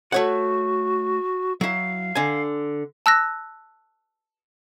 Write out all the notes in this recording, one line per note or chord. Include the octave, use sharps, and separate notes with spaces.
A3 F#4 C#5 F#5
F#3 E4 F5
D3 G#5
A5 E6 F#6 A#6